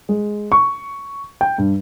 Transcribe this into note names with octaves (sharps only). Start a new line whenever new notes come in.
G#3
C#6
G5
G2